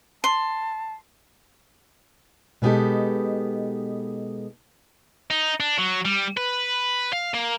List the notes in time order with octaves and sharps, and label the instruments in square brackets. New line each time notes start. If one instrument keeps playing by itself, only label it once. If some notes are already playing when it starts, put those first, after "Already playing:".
[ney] A5 [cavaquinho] C6
[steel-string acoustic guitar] B2 G#3 B3 D#4 G4 A4
[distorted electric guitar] D#4
D4
F#3
G3
B4
F5
A#3